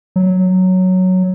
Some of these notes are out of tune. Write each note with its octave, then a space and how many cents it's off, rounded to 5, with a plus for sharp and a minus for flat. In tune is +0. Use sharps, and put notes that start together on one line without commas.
F#3 +0